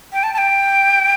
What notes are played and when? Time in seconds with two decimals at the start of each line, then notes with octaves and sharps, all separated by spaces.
0.13 G5
0.23 A5
0.33 A5
0.38 G5